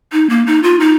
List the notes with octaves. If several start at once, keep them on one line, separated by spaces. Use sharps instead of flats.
D#4
A#3
D#4
F4
D#4